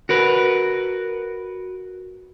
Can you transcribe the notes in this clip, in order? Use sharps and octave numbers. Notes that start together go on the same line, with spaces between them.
F#4 A#4 B4